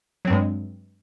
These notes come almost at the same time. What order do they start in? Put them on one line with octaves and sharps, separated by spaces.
F#3 C4 G2 G#3